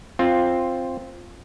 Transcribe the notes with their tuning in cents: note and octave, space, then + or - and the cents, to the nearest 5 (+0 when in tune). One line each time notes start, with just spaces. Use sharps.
C4 +10 F4 +0